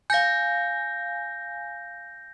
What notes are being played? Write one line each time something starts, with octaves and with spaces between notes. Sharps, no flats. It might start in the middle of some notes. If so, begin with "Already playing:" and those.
F5 G#5 G6 A#6